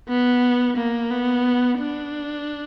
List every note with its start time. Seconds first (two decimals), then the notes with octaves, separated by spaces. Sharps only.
0.09 B3
0.77 A#3
1.10 B3
1.78 D4